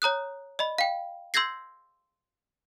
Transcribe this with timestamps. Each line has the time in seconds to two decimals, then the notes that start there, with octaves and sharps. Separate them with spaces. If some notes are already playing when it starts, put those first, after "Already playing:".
0.02 C#5 A#5 D#6 F#6
0.59 D5 D#5 B5
0.78 F5 G5
1.34 C6 E6 G6 G#6 A#6 C7